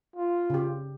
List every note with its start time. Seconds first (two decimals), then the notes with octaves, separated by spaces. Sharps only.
0.16 F4
0.50 C#3 G4